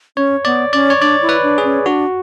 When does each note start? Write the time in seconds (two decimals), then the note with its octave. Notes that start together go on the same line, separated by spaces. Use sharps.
0.17 C#4 C#5
0.45 B3 D5
0.73 C#4 D5
0.90 C#5
1.01 D4 D5
1.22 E4
1.29 B4
1.43 D4
1.58 G#4
1.64 C#4
1.85 D4 F#4